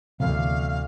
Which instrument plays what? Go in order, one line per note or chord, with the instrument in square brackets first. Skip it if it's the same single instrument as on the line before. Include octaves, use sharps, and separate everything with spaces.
[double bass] D2 [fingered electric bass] C3 E3 B3 [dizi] F5